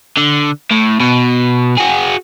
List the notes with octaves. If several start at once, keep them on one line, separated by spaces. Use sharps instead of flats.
D3
A2
B2
F#4 G#4